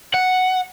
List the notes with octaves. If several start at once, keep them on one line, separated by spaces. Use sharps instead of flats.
F#5